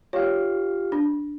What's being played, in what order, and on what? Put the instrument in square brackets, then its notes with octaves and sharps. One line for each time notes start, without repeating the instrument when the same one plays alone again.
[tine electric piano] F4 G4 F5 [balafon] C#5
[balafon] D4